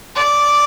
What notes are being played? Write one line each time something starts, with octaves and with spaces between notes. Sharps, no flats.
D5